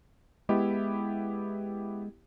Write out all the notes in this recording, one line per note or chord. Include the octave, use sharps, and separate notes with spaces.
G#3 B3 E4 G4